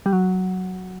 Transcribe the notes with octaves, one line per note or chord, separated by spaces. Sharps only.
G3
F#3